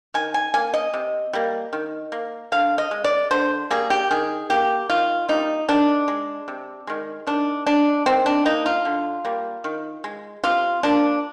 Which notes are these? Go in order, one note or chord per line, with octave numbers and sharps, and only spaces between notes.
D#3 G#5
G#5
A#3 G#5
D#5
C3
G3 A#3
D#3
A#3
D3 F5
D#5
G#3
D5
D3 C5
G3 A#3 G#4
G4
D#3 G#4
A#3 G4
D#3 F4
G3 A#3 D#4
D#3 D4
G#3
C3
D#3 G#3
D#3 D4
G#3 D4
D#3 C4
D4
A#3 D#4
F4
D3
G3 A#3
D#3
G#3
C3 F4
F3 A#3 D4